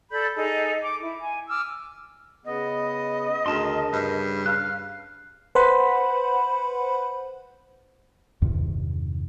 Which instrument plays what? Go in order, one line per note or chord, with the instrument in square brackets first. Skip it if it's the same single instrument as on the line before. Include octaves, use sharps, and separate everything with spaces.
[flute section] A4 D5 B5 G6
D#4 G#4 A4
D6
E4
G#5
D6 E6 F6
[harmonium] C#3 B3 [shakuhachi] D#5
[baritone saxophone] D2 [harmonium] C#3 [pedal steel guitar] A#4 A5 C6
[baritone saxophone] G2
[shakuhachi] F5 [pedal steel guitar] F#6
[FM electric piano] B4 C5 F#5 B5
[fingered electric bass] E2 G2 C3 D#3